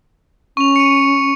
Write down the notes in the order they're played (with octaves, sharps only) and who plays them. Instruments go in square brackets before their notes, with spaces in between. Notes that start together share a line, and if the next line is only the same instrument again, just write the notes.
[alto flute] C#4 [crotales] C#6 F7
[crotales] C#7 D#7